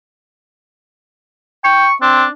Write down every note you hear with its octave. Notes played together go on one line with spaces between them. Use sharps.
G5 C#6
C4 D4